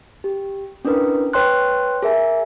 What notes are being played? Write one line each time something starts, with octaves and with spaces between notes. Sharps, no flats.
G4
C#4 D4 E4 A#4 B4
B4 C#5 G5 C6 F#6
G#4 A#4 E5 G#5